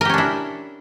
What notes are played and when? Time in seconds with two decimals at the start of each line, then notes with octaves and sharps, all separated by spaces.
0.01 A#4
0.05 G4
0.09 C#4
0.14 D4
0.18 E4